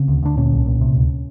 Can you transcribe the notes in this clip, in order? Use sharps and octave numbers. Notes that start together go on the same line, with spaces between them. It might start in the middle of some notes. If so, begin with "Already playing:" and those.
Already playing: C#3 C4
D2
D2 D4
A#2 C#4
C2
A#2
C3
D2